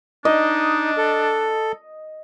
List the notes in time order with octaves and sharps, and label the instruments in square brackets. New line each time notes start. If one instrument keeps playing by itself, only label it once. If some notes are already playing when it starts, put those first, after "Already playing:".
[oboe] D4 [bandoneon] D#4 [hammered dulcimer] D#5
[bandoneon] A4